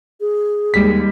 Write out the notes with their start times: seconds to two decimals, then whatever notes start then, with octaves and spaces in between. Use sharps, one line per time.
0.21 G#4
0.74 D#2 G3 G#3 B6